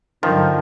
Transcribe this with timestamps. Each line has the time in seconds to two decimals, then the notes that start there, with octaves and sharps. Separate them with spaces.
0.23 G2 D3 D#3 F3 F#3